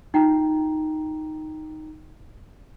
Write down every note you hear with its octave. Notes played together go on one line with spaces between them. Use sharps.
D#4 F4 G5 A#5